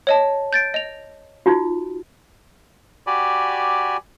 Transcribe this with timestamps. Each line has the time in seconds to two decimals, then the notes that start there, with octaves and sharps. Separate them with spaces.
0.07 C#5 D#5 A5
0.53 G6 A6 D7
0.74 D#5 F7
1.46 D#4 F4 F#4
3.07 F#4 G4 D5 G#5 B5